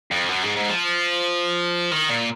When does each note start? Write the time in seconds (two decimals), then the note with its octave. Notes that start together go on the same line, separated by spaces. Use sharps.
0.11 F2
0.29 F#2
0.43 G#2
0.56 G#2
0.69 F3
1.91 D#3
2.09 A#2